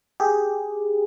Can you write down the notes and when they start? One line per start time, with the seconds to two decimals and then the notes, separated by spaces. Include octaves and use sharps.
0.20 G4 G#4